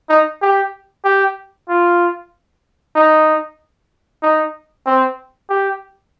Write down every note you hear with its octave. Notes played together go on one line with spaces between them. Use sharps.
D#4
G4
G4
F4
D#4
D#4
C4
G4